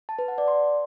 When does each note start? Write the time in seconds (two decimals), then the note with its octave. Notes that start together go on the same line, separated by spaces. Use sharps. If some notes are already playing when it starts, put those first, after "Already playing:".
0.09 A5
0.19 B4
0.28 F#5
0.38 D5
0.48 C6